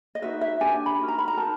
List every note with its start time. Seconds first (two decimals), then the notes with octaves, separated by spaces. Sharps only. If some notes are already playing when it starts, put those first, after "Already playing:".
0.15 D#5
0.22 D#4 F#4 B4 E5
0.41 E5
0.61 D4 G4 B4 G#5
0.86 B5
0.99 D#4 F#4 A#4
1.08 A#5
1.18 B5
1.28 A#5
1.37 D#4 F#4 A#4 A5